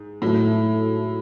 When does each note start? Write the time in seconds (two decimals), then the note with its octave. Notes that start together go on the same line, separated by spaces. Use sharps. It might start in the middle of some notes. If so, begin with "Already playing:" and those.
Already playing: G#2
0.22 A2 F#3 A3 E4 A4